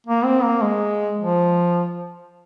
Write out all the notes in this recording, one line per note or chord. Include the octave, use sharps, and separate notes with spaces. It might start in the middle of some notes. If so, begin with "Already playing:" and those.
A#3
C4
A#3
G#3
F3